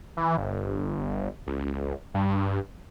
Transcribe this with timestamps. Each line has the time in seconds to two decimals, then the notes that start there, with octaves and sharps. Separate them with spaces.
0.17 E3
0.37 G1
1.47 C#2
2.14 G2